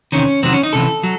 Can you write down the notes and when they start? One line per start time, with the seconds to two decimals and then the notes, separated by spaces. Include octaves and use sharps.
0.12 E2 C3 D#3 C#4
0.43 E2 C3 D#3 F#3 C4
0.53 C#4
0.63 D#4
0.73 C#2 C3 E3 A4
1.03 F#3